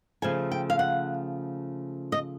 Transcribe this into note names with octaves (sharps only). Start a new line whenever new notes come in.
C#3 F3 A3 G#5
G5
F5
F#5
D#5